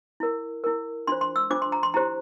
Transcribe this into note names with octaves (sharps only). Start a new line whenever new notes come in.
E4 A#4
E4 A#4
D4 F4 C5 C6
C6
E6
D4 F4 C5 D6
C6
A#5
C6
E4 G4 C5 A#5